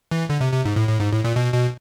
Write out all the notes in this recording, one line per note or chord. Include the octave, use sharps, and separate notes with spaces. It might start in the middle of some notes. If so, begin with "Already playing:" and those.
E3
D3
C3
C3
G#2
A2
A2
G#2
A2
A#2
B2
B2